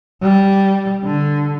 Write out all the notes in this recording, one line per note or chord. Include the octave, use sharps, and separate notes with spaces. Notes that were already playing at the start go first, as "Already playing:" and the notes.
G3
D3